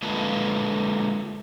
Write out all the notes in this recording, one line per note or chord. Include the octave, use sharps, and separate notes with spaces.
D3 G#3 A#3 F4 A4 B4